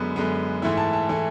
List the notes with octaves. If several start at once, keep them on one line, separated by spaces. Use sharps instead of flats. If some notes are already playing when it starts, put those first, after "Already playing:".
Already playing: F#2 D3 G#3 B3
F#2 D3 G#3 B3
G#2 E3 A3 E4
A5
A5
E3 A3 E4